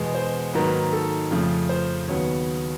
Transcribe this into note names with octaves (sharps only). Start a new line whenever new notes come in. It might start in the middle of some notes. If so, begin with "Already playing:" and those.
Already playing: E2 B2 G#3 B3
C5
G#2 D#3 F#3 A#3 B4
A4
F2 C#3 F3 A3
C5
D#2 C#3 F#3 B3 C#5